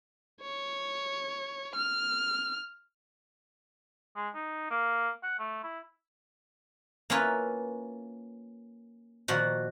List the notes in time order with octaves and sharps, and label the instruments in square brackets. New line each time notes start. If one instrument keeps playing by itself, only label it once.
[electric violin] C#5
F6
[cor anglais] G#3
D#4
A#3
F#5
A3
E4
[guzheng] A#3 C#4 E4 F4 B4
A#2 D#3 F3 F#4